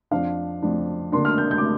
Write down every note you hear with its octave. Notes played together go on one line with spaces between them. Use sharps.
F2 F3 D4 F5
F2 F3 D4
D3 A#3 D4 C6
F6
G6
G6
D6